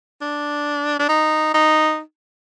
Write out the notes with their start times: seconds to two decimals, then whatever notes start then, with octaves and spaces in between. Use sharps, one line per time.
0.21 D4
0.99 D4
1.09 D#4
1.54 D#4